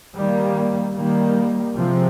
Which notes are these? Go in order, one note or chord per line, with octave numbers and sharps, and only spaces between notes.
D#3 G3 A#3
D#3 G3 A#3
C3 F3 G#3 C4